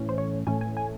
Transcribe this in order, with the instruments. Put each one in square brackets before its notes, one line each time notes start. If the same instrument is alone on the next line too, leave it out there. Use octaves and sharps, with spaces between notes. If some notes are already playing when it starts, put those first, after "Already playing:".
Already playing: [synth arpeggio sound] A2 E3 A3 C#4
C5
C#5
A2 E3 A3 C#4 G#5
G#5
G#5